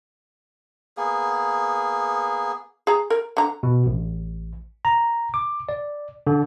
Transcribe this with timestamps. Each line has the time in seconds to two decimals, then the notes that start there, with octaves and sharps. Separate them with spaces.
0.97 A#3 B3 G#4
2.87 G#4 A#5
3.10 A#4
3.37 D3 A#5
3.63 B2
3.86 A1
4.85 A#5
5.34 D6
5.69 D5
6.27 D3